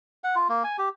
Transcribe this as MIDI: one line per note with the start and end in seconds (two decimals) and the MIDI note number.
0.24 0.35 78
0.36 0.48 65
0.49 0.63 58
0.64 0.77 80
0.78 0.89 67